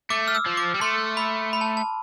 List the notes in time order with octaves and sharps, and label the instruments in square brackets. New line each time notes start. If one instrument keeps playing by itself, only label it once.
[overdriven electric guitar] A3 [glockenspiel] D6
[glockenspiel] F6
E6
[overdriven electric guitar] F3
[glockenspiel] D6
[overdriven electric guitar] G3
[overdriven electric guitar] A3 [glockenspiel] C6
[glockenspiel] B5
B5
A5
A5